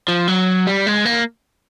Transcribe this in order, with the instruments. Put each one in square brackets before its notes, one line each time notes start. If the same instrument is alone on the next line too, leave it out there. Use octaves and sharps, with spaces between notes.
[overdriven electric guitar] F3
F#3
G3
G#3
A#3